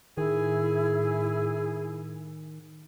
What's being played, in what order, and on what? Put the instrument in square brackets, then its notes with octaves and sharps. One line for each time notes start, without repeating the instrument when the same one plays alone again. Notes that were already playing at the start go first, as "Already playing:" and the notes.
[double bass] A2 [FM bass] D#3 [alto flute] E4 [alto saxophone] G#4